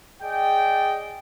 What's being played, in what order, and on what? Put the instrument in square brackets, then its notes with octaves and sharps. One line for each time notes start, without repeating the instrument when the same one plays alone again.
[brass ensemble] G#4 D5 D#5 G5